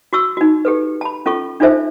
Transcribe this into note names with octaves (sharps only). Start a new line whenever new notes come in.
F#4 C#6 E6
D#4 F#4
G4 A4 B4
A5 B5
C#4 F4 A4 C#6
D4 D#4 F4 A4 C5 E5